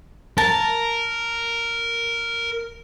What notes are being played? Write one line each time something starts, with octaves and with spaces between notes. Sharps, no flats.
A#4 A5